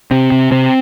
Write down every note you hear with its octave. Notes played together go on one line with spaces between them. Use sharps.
C3 C4
C3
C3 C4